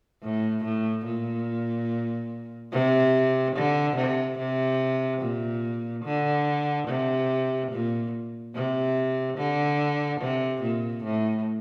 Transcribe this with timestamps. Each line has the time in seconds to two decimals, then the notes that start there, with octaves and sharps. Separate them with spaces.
0.23 A2
0.64 A2
1.05 A#2
2.72 C3
3.56 D3
3.96 C3
4.38 C3
5.21 A#2
6.04 D3
6.88 C3
7.72 A#2
8.54 C3
9.38 D3
10.21 C3
10.62 A#2
11.04 A2